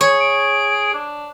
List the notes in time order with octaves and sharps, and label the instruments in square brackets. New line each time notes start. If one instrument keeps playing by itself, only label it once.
[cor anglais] G#4 [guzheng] C#5
[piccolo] D7
[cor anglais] D4